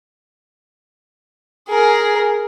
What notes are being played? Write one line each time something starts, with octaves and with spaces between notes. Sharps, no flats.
G#4 A#4